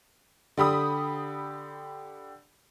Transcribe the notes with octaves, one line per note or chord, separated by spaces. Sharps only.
D3 G4 B5 D#6